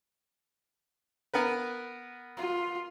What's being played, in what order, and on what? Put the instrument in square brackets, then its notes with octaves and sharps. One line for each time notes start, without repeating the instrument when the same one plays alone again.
[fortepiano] B3 A#4 B4
[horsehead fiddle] F4